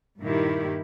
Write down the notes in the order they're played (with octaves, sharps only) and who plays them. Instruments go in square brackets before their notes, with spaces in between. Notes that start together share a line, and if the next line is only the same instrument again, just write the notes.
[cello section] G2 A#2 D#3 E4 G4